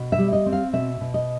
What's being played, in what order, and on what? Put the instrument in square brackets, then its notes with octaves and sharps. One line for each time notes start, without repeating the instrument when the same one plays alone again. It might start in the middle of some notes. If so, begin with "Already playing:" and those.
Already playing: [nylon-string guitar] B2
E5
G3
D#5
C4
F5
B2 E5
B2
D#5